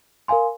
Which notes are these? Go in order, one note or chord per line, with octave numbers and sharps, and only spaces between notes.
A#4 F5 G#5 C6